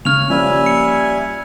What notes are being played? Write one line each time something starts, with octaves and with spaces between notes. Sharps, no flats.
C#3 C#5 F6 F7
F3 G3 A#3 C#4 E5 G#5
C#7